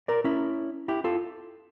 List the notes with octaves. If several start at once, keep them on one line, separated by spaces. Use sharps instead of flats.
A#4 D5
C#4 E4
E4 G4
F4 A4